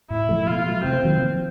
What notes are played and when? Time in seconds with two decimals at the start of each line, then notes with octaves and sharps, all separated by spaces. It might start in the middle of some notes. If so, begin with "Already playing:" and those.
0.10 A2 E4
0.29 F3 A3
0.47 B2 F4
0.66 F#3 A3
0.84 C3 C4
1.03 D#3 F#3 A#3
1.22 F3